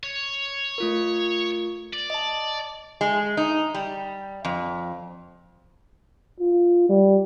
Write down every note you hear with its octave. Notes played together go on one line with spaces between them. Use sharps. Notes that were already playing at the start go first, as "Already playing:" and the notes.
C#5
A3 F4 A#4
D5
D#5 A5
G#3
D#4
G3
F2
F4
G3